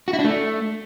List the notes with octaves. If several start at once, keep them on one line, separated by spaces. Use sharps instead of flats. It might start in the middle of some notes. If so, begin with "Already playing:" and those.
F#4
E4
D4
A3